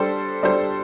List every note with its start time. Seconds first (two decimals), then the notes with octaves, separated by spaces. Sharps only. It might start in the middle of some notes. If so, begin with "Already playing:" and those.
Already playing: G3 D4 A4 C5
0.43 G3 D4 A4 C5